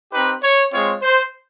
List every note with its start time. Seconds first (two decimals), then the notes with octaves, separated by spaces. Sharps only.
0.13 C4 D#4 G4 B4
0.42 C#5
0.72 G#3 C4 F4 C#5
1.02 C5